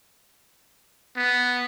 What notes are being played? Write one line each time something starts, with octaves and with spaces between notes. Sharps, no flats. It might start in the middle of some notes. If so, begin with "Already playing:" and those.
B3